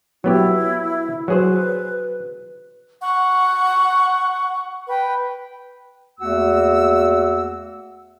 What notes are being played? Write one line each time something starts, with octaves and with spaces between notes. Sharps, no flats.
F#3 B3 E4 G4
F#3 G#4 B4 C5
F#5 C#6
B4 G5
E2 A3 A#3 F#4 F#5 E6